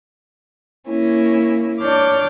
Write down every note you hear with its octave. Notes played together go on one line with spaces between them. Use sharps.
A#3 C#4 E4
D4 C#5 D6 F6 G6